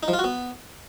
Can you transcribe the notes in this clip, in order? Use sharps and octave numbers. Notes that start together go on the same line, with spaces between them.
D#4
F3
F4
F#4
B3